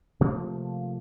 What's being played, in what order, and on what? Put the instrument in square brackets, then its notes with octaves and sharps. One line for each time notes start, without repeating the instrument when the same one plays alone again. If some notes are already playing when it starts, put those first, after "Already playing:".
[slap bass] C3 F3 A3 A#3